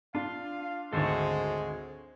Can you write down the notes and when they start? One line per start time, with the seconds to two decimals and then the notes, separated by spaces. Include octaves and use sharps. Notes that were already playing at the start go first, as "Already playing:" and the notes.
0.15 D4 F4 F5
0.93 G#1 D2 G#3 A4 C5 C#5